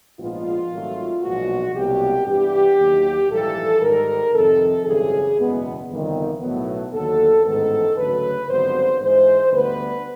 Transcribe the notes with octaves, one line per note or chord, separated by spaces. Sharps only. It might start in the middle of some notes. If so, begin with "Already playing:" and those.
A#1 G#2 F3 G#3 B3 F4
G#1 G#2 D#3 F#3 A3
B1 A#2 F3 G#3 B3 F#4
C2 B2 F#3 A#3 G4
G2 E3 G3 B3 G4
D#2 D#3 F#3
A#1 G#2 E3 G3 A#3 A4
G#2 D#3 G3 A#4
F2 C3 D#3 A4
G#1 F#2 C#3 E3 G3 G#4
F#1 E2 B2 G#3 B3
G1 F2 C3 D#3 G3
B1 A2 F#3 B3
D#2 D3 F#3 A4
A1 G#2 D#3 G#3 B3 A4
D2 C#3 F#3 B4
G#1 G2 D3 F#3 B3 C5
G#2 E3 G#3 C5
D2 D3 G3 B3 B4